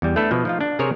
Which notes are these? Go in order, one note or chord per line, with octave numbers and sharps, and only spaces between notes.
E2 G3
A3 B3 D4 E4 A4
B2 F3
F3 D#4 F4
D4
C3 G#4 A#4 C5 C#5